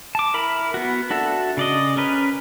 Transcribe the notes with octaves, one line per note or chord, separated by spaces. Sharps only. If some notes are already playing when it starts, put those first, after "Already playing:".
A5 D6
E4 A#4 B5
B3 F#4
D4 F#4 A4 E5
C#3 D5 D#5
C#4 A#4 B4